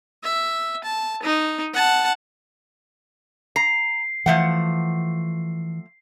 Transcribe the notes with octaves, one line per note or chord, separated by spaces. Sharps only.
E5
A5
D#4
F#5 A5
A#5 C7
E3 F3 A3 F#5